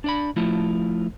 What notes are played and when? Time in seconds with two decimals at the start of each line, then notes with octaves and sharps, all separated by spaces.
0.04 D4 D5 B5
0.36 F3 A3 E4 F4